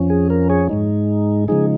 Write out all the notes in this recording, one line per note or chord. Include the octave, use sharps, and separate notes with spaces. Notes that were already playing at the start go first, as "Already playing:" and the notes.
Already playing: F2 F3 C#4
G#4
A#4
G#4 C#5
G#2 G#3 D#4
C#3 F3 G#3 D#4 G#4